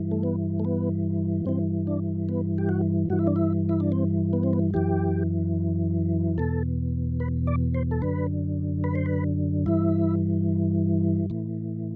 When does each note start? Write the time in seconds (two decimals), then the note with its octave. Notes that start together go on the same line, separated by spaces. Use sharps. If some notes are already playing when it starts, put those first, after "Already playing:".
Already playing: G2 E3
0.11 A3
0.23 B3
0.59 A3
0.65 B3
1.46 G2 E3 C4
1.87 D4
2.29 B3
2.58 G4
2.69 F#4
3.10 G2 E3 F#4
3.19 E4
3.27 D4
3.36 E4
3.69 E4
3.80 D4
3.92 C4
4.33 B3
4.43 C4
4.53 B3
4.74 F#2 E3 G4
6.38 E2 B2 A4
7.20 B4
7.47 D5
7.74 C5
7.91 A4
8.02 F#2 D3 B4
8.84 B4
8.95 C5
9.06 B4
9.66 G2 E3 E4
11.30 A2 E3